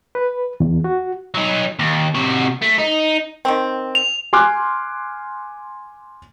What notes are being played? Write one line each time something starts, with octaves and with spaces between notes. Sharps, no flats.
B4
E2
F#4
F#3 D#4
D#2
C3 F#4
A3
D#4
D#3 C4
F7
G#5 C6 D6 F6 F#6